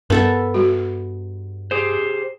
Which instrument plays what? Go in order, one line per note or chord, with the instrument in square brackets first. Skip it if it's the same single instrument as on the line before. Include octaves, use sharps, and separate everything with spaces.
[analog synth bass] G2 [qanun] B3 A4 E5 [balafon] A#4
[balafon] G3 F#4
[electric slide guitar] G4 G#4 C5